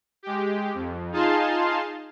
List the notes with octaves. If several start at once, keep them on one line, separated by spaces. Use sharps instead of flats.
G#3 G4
F2
D#4 F4 G#4 F5 A5 C6